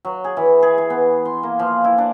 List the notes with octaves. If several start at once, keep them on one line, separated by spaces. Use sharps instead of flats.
F#3
G#4
E3
G#4
G#4
B3
C6
A#3
F3
E4
D4